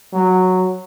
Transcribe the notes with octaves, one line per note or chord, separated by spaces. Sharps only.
F#3